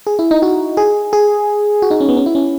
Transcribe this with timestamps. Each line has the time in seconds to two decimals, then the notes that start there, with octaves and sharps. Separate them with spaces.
0.07 G#4
0.19 E4
0.31 D#4
0.42 F#4
0.77 G#4
1.13 G#4
1.82 F#4
1.91 D#4
2.00 C#4
2.09 B3
2.17 C#4
2.26 E4
2.35 C#4